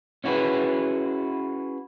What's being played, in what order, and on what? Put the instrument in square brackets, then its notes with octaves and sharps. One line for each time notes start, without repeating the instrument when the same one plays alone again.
[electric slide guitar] C#4 E4 F#4 G#4 B4